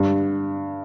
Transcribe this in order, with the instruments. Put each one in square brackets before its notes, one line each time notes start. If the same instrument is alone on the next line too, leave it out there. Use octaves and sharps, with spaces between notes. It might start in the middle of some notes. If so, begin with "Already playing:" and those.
Already playing: [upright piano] G2